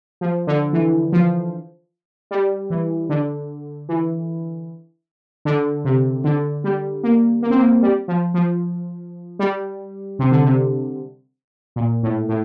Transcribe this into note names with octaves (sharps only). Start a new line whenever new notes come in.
F3
D3
E3
F3
G3
E3
D3
E3
D3
C3
D3
G3
A#3
A#3
C4
A#3
G3
F3
F3
G3
C3
D3
C3
A#2
A2
A2